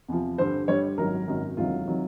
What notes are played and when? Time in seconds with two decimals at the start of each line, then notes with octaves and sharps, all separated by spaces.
0.08 E2 C3 F3
0.38 G2 D3 G3 C5
0.68 G2 D3 G3 C#5
0.98 G#1 F#2 D#3 F#3 A#4
1.28 G#1 F#2 D#3 F#3
1.57 E1 D2 C3 D#3 F#3 F4
1.87 C3 D#3 F#3